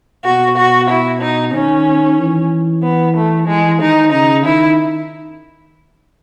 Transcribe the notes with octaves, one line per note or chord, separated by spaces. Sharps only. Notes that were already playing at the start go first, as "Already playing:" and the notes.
B2 F#4
F#4
E4
D#4
D#3 C#4
E3
B3
A3
E3 G#3
D#3 D#4
C#3 D#4
D#3 E4